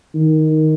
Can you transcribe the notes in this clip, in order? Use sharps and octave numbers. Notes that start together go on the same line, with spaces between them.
D#3